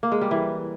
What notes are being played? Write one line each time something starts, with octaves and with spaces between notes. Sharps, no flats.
A#3
G#3
G3
E3